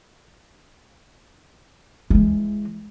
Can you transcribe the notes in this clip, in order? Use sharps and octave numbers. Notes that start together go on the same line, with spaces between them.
E3 G#3